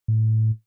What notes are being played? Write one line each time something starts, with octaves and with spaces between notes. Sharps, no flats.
A2